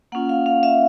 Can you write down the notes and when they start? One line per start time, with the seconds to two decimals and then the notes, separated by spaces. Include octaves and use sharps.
0.12 A#3 C#4 F4 F#5
0.29 F5
0.46 F5
0.63 E5